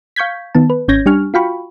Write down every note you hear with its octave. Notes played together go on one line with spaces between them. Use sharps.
F5 C#6 G6 G#6 B6
D#3 B3 A5
B4
G#1 C#4 C#5 G6 G#6 A#6
G3 D4 G4 G#5 C#6 F6
F4 F#4 F5 G5 B5 C#6